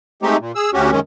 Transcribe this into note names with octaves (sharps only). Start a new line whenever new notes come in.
G#3 A3 C4 D#4 G4
A#2
G#4 E6
D2 C#4 F#4 G4
F#2 D#3 G#3 C#4